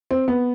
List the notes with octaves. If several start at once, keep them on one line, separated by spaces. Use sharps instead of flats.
C4
B3